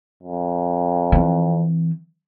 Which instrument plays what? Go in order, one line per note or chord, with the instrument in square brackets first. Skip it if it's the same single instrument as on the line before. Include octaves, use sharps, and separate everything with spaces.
[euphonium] F2
[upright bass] E3 C4